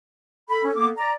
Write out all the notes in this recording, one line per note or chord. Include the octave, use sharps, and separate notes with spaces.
A4 B5
C#4
A#3 B3 D6
D5 A#5